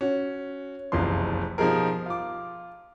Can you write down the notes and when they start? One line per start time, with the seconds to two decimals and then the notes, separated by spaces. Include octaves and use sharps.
0.01 C#4 F#4
0.92 F#1 C2 F2 E3 F3 C6
1.58 B2 F3 G3 D#4 G#4 A#4
2.06 F4 D6